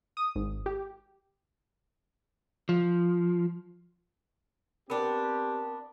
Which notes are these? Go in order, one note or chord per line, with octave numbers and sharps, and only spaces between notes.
D#6
G#1
G4
F3
B3 C4 D4 G4 A#4